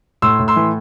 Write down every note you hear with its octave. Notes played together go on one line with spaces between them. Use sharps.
A2 C6 E6
A2
C6 E6
E3